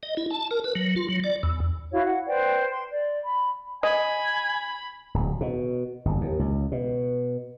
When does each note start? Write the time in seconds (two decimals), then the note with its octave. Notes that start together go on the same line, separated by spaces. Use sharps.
0.03 D#5
0.17 E4
0.31 A5
0.51 A#4
0.64 B4
0.75 F#3
0.96 F4
1.08 F#3
1.24 D5
1.43 E2
1.92 E4 F#4 C#5 F5
2.05 F#5
2.28 B4 C5 D5 G5
2.71 C6
2.91 D5
3.24 B5
3.83 D#5 G#5 B5
5.14 D1
5.41 B2
6.05 G1
6.21 D#2
6.39 C#2
6.72 B2